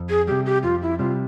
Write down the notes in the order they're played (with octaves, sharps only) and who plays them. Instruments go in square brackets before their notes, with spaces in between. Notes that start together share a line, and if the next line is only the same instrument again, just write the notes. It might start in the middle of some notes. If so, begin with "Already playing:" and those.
Already playing: [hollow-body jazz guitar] F2
[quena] G#4
[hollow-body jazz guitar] C3 G3 [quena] G4
[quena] G4
[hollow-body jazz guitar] F2 [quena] F4
[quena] E4
[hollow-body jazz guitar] C3 G3 [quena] F4